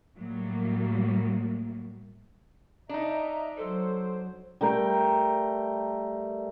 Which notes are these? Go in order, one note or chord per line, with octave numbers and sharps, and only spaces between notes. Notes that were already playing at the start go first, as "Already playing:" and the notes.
A2 F#3 G3 A#3
D4 D#4 D#5 E5 A#5
F#3 A4 C5
G3 A3 A#4 G5